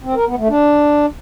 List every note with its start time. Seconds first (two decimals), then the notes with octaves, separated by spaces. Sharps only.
0.03 C4
0.15 A#4
0.26 B3
0.38 A3
0.49 D4